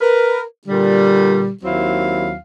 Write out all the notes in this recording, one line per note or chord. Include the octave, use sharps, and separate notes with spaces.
A#4 B4
A#2 D3 G3
D#2 F#3 C4 E4 F5